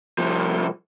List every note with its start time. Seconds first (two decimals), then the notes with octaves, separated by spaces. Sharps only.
0.18 C2 F3